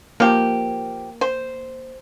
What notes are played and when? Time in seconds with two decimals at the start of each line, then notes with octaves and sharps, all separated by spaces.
0.20 F3 A#3 G4
1.21 C5